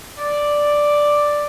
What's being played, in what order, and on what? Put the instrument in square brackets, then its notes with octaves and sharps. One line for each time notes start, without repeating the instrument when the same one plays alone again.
[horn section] D5